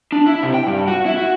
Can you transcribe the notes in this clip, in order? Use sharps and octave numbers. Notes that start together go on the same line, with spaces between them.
D4
E4
C3
G5
G2
F#4
E4
F#4